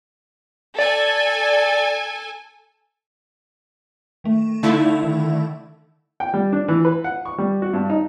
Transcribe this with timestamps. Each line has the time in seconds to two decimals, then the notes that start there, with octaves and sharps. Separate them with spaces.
0.79 A4 D5 G#5
4.24 D#3 A3
4.63 D3 A3 D#4 E4 E5 F5
5.03 D#3
6.20 G5
6.34 G3
6.53 D4
6.68 E3
6.85 B4
7.04 F#5
7.25 C#6
7.38 G3
7.62 F#4
7.73 G2
7.90 D#4